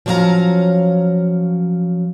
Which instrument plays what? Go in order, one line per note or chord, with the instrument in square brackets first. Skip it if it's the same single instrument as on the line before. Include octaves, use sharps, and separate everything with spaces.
[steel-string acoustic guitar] F3 F#3 C#4 D5 F5 A#5